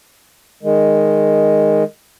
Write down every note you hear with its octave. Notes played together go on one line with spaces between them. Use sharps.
D#3 G#3